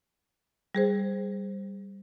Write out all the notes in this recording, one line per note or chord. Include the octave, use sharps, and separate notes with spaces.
G3 G#4 C5